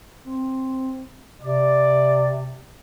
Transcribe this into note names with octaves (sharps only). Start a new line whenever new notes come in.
C4
C3 D5